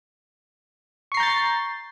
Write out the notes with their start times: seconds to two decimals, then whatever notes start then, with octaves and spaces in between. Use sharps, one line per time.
1.12 C#6
1.14 C7
1.17 A#5
1.20 G6
1.23 A6